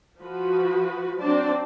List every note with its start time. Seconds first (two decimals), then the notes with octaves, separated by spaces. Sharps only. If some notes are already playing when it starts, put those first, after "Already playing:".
0.21 F3 F#4 B4
1.19 F#3 C4 D4 C5 D5 A5